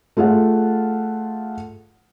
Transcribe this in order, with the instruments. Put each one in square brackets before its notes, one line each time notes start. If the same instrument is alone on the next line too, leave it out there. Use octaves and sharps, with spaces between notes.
[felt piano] A3 F4 G#4 F#5